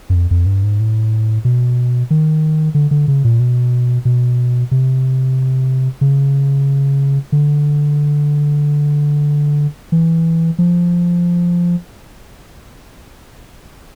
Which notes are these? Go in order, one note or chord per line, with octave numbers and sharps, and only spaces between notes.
F#2
F2
F2
G2
G#2
A2
B2
D#3
D3
D3
C#3
A#2
B2
B2
C3
C#3
D3
E3
F3